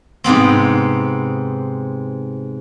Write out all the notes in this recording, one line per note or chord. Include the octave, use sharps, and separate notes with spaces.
G#2 C3 B3 C4